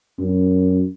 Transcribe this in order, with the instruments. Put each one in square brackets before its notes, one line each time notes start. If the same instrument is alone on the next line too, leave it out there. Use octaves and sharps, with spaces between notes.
[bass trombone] F#2